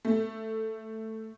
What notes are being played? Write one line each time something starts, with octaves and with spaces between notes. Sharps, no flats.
A3